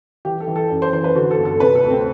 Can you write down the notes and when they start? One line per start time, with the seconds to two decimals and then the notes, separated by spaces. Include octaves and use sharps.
0.25 E3 G4
0.40 A4
0.47 E3
0.56 A4
0.70 F#2
0.82 C5
0.92 E3 C5
1.04 B4
1.15 D3 F#4
1.31 A4
1.38 G1
1.45 A4
1.60 C3 B4
1.75 A4
1.83 D2
1.90 C4